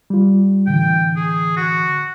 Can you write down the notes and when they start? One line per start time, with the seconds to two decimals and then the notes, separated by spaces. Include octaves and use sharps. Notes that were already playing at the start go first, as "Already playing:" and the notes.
0.10 G3 F4
0.67 A2 D3 E3 G5
1.17 G#4
1.57 F#4